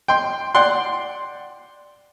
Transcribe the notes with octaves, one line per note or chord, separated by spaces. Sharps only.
G5 C6
D5 F#5 G5 C6